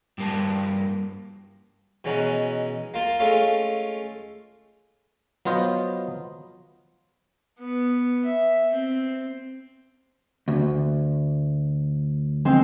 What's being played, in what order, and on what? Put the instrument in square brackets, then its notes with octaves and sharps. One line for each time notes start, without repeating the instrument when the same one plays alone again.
[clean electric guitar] G2 A#3 A5
[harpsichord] B2 E3 G#3 C#4 D#4 F#4
A#3 F4 A5
G#3 A3 C#4 F4 A4 F5
[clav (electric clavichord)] F#3 B3 F4 C5 D#5
[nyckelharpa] B3
E5
C4
[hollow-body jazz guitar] D2
[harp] G#3 C4